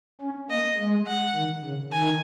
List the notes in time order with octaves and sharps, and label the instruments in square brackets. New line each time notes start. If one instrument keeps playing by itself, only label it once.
[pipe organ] C#4
[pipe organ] A#3 [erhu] D#5
[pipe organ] G#3
[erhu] F#5
[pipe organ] D#3
C#3
[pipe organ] D#3 [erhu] G#5